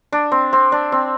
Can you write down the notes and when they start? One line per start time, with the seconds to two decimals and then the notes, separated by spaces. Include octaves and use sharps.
0.12 D4
0.32 C4
0.53 C4
0.72 D4
0.92 C4